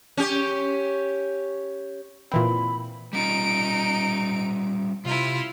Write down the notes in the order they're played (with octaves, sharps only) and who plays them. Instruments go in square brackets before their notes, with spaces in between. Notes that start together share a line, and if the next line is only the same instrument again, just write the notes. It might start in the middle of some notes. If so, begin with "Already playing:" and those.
[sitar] C#4 G4
[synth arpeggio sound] A#2 E3 C4 [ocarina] B5
[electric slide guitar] G3 C#4 F4 [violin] D#4 D7
[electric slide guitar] C3 [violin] E4 F4